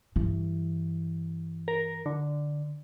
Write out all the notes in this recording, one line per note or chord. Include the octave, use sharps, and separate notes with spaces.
G2 E3
A#4
D3